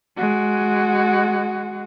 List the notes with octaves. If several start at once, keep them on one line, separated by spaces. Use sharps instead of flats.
G#3 F#4